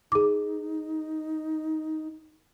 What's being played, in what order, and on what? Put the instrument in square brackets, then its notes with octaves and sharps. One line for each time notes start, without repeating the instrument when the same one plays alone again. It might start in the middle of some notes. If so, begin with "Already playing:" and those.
[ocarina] D#4 [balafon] G#4 D6